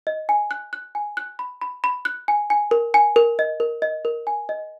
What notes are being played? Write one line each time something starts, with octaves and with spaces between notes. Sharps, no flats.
D#5
G#5
F#6
F#6
G#5
F#6
B5
B5
B5
F#6
G#5
G#5
A#4
G#5
A#4
D#5
A#4
D#5
A#4
G#5
D#5